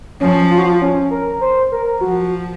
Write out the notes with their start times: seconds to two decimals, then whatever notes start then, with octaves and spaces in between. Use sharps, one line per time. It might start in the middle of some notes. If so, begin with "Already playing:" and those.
0.20 F3 C#4
0.51 F4
0.58 F#4
0.65 F4
0.82 C#4
1.11 A#4
1.41 C5
1.72 A#4
2.01 F3 F#4